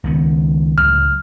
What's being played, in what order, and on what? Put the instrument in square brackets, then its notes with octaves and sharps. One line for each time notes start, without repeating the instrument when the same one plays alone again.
[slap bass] C#2 D#3 B3
[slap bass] C#2 A2 F#3 [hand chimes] F6